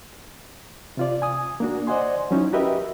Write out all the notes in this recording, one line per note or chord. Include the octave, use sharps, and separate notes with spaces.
C3 F4 D5
G#5 D#6
A#3 D4 F#4
C5 D5 D#5 F#5 G#5 C6
F#3 C#4 D#4 E4
F#4 G4 A#4 B4 D#5 E5